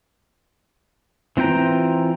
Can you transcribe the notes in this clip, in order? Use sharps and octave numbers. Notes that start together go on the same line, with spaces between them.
E3 C4 F4 G5 A#5